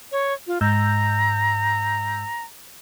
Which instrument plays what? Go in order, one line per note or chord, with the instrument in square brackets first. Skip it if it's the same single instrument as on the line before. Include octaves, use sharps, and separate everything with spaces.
[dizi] C#5
F4
[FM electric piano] G#2 E6 G6 [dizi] A#5